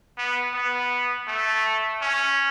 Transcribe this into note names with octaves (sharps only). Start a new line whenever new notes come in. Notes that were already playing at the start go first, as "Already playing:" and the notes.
B3
B3
A3
C#4